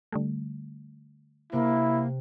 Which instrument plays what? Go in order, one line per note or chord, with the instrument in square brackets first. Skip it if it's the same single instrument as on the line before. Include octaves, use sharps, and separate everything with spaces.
[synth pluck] D3 G3 A3
[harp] C3 [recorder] A#3 [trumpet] E4